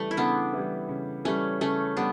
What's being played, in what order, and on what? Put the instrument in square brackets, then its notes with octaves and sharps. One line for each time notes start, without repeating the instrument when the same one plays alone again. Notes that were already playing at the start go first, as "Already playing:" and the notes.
Already playing: [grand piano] C#3 E3 G3 [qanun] A3
[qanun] E4
[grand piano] C#3 [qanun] B3 D4
[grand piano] E3 G3
C#3
[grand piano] E3 G3 [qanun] A3 C#4
[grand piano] C#3 [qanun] A3 C#4
[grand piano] G3 [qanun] B3 D4